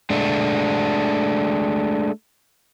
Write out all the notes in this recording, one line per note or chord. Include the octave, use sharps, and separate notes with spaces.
G#3 A3 D4